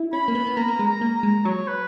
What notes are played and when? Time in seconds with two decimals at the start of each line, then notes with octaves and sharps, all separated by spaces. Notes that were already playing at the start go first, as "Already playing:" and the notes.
Already playing: E4
0.13 C#4 B5
0.28 A#3
0.35 B3
0.47 B3
0.57 A#3 A#5
0.68 A#3
0.79 G#3
0.86 A#5
1.01 A#3
1.16 A#5
1.23 G#3
1.45 F#3 C#5
1.67 B4